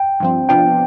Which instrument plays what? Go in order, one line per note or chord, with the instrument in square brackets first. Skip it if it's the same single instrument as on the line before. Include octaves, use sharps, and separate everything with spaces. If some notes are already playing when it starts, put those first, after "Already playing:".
Already playing: [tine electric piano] G5
[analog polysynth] G2 F3 C4
[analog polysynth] C3 F3 B3 D4 F4 [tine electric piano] G5